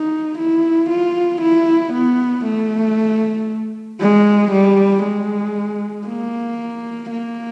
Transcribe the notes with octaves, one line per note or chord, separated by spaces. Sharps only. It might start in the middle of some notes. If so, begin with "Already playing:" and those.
Already playing: D#4
E4
F4
E4
B3
A3
G#3
G3
G#3
A#3
A#3